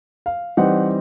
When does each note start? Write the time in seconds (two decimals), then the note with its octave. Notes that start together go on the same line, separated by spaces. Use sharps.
0.26 F5
0.57 E3 G3 C4 D#4 F#5